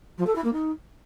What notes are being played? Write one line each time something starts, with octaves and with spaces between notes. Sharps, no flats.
F3
A4
E4
A#3
D#4